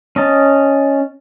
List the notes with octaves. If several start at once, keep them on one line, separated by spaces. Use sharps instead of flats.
C#4 D#5 A5